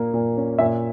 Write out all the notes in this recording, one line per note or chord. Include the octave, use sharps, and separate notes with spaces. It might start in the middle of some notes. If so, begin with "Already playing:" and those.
Already playing: A#2 A#3
A#2
C#4
A#2 E5